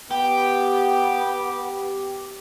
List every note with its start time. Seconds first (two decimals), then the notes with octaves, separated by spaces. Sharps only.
0.11 B3 G4